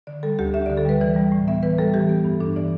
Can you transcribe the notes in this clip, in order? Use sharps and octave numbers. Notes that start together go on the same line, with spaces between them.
D3 D5
G3 A4
D2 G4
D2 E5
D5
D3
A4
G3 B4
E3 D5
G3
A2
B3 E5
E3 B4
G3 A4
E3 G4
B3
G2
D4 A4
E3 D5